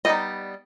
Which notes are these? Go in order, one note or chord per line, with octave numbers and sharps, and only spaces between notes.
G3 B3 D#4 D#5